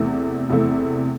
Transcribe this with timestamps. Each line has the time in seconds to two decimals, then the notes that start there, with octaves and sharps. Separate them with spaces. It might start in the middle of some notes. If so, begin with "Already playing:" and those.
Already playing: E2 C3 A3 E4
0.50 E2 C3 A3 E4